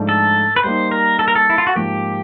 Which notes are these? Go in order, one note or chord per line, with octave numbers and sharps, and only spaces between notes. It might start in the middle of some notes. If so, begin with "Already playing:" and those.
Already playing: G#2 F3 A3 D4
A4
B4
G3 A#3 D#4 C5
A#4
A4
A#4
A4
E4
F4
F#4
G#2 F3 A#3 G4